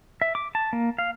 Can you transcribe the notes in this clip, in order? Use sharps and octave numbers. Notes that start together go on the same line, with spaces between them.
E5
D6
A5
A#3
F5